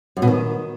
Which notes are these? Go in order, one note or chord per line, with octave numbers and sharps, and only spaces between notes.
F#2
B2
D#3